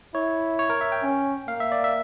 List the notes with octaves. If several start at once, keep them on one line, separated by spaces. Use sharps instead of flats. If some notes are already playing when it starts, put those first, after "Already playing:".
E4 C#5
C#5
A#4
E5
G5
C#4
A#3 F5
E5
D5
E5